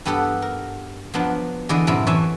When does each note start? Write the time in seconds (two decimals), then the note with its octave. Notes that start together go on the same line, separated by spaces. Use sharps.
0.05 G2 B3 G4 A4 F#5
0.42 A#4
1.14 F3 F#3 B3 D4
1.69 D3 E3 E4 G#4 D5 D#5
1.87 F#2 A2 C3 E4 D5
2.07 E3 C#5 D5 E5 G#5 A5